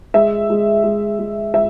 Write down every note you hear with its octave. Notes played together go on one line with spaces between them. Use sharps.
G#3 E5
G#3
G#3
G#3
G#3 E5